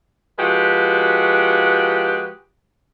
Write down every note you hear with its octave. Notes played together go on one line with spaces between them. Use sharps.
F3 G#3 F#4 G4 B4